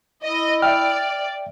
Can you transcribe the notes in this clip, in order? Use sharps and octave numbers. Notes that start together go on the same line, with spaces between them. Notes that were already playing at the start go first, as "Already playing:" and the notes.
E4 D#5
D5 E5 G5 F6